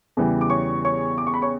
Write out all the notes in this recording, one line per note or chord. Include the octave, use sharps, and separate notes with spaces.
E2 C#3 E3 G3
D6
C#5 C#6
C#5 C#6
D6
C#6
B5
C#5 C#6